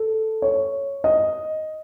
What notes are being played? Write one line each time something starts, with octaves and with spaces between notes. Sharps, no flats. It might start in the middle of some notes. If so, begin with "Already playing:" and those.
Already playing: A4
C#5
D#5